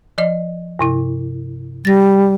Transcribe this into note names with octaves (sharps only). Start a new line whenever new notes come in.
F3 D5 D#5
G2 C3 E4
G3 A6 A#6